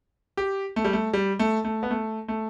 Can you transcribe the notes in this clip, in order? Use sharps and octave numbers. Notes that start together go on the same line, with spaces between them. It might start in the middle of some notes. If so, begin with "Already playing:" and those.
G4
A3
G3
A3
G3
A3
A3
B3
A3
A3